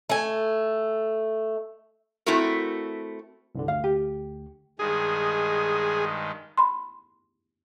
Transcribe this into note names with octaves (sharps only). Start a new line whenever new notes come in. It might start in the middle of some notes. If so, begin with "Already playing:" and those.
A3 G#5
A3 C4 E4 F#4 A#4
C2 G2 D3
D2 F5
G4
G2 D#3 G#3 G#4
B5 C6